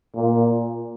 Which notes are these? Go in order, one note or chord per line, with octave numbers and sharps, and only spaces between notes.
A#2